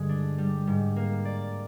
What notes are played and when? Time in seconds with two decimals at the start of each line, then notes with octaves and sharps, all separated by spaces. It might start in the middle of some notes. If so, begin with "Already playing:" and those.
Already playing: G2 D3 G#3
0.09 D4
0.38 G3
0.67 G#2
0.96 A#3
1.25 D5